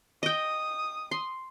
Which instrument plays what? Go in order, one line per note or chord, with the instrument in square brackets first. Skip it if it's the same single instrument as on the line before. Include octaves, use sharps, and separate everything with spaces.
[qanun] D#5 G5 [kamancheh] D#6
[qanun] C6